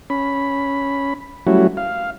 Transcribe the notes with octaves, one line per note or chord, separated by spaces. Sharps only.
C#4 B5
F#3 G3 A3 C#4 E4 F#4
F5